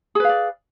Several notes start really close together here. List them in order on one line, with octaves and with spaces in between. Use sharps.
G#4 B4 F5 D5